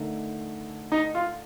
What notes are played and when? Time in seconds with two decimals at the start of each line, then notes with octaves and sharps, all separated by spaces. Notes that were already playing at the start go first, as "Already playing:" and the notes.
Already playing: D3 A3 D#4 A#4
0.92 D#4
1.15 F4